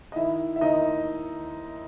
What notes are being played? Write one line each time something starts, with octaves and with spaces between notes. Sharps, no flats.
D#5
D#3 E4 E5
E5
D#2 D#4 D#5